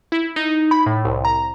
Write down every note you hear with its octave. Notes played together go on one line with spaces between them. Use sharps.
E4
D#4
B5
A2
C2
A#5